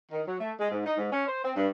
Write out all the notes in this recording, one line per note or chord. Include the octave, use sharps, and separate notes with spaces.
D#3
F#3
A3
G#3
G#2
D#4
G#2
C#4
C5
C4
G2